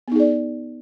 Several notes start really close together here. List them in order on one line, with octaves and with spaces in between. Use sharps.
B3 D#4 G#4 D5